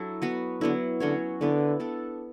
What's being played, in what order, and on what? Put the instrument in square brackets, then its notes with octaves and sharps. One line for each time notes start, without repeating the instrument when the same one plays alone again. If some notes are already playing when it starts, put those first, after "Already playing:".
Already playing: [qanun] F#3 D4 E4 A4
B3 F#4 B4
[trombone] D3 [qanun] F#3 B3 E4
[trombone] D3 [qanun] F#3 C#4 F#4 C#5
[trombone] D3 [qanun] B3 E4 B4 D5
[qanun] B3 D4 A4